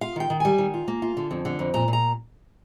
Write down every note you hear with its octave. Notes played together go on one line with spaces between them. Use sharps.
F4 F5
D#3 G5
D#3
G3 G#5
D#3
F4
A#3
F4
D3
F2
D3
F2
A#2 A#5
A#2
A#5